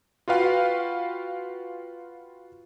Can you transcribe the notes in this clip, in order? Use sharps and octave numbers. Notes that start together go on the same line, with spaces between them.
F4 F#4 B4 F5 G5